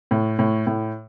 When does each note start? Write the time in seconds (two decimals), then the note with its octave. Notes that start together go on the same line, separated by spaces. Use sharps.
0.11 A2
0.39 A2
0.67 A2